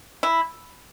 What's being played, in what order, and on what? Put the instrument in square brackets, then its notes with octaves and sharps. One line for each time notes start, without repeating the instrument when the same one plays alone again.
[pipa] E4